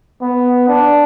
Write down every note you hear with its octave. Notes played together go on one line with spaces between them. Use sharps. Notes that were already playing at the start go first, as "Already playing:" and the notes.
B3
D4